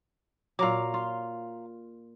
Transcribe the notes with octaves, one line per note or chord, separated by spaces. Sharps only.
A#2 F#3 F5 A#5 D6
F4